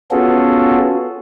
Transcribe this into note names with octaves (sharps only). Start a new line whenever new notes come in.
B3 C#4 F4 F#4 G#4 A4